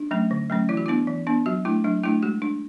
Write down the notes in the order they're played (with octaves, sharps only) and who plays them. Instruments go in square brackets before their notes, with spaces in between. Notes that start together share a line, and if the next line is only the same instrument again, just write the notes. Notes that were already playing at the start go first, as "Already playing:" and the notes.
Already playing: [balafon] D4
F#3 A3 C#4
D3
F#3 A3 C#4
E3 E4
F#4
B3 D4 E4
E3
B3 D4
F#3 F#4
A3 D4 E4
F#3 D4
A3 D4 E4
G#3 F#4
D4